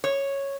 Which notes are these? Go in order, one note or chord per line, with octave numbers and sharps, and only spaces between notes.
C#5